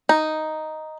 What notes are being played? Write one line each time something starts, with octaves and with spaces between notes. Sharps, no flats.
D#4